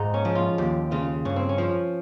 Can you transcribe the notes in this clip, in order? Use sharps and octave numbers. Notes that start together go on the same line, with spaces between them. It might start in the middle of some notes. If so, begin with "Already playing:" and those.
Already playing: G#2 D#4 F4
C#4
F3
F4
D#2 G4
C#3 F4
G2 C#4
C4
C#4
F3